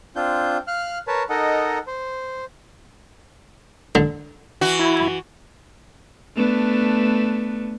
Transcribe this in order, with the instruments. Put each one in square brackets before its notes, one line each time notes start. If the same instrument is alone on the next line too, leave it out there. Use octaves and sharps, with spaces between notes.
[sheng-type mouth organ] C4 D4 F4 G6
F5 F6 F#6
A#4 B4 C#5 A5
D#4 A4 A#4 D#5 F#5
C5
[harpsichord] D3
[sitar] E3 F#4
[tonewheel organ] E4
[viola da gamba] A3 B3 D4